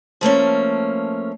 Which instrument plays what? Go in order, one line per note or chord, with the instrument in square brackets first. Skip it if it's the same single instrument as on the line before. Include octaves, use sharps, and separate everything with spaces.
[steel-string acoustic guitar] F3 A3 A#3 C#4